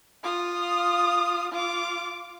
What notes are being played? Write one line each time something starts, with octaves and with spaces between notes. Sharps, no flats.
F4 D#6
F4 D6